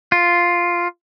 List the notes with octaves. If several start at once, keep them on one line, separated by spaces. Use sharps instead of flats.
F4